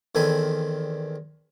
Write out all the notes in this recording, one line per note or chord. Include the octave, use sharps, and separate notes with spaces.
E2 D#3 C4 A4 G#5 B5